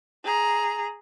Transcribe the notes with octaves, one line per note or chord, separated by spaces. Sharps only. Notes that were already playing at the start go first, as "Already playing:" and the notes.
G#4 A#5